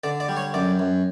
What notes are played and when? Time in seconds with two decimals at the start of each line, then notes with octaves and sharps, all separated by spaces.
0.04 D3 D5
0.20 D5
0.29 G3
0.37 C#5
0.54 F#2 D5
0.79 F#2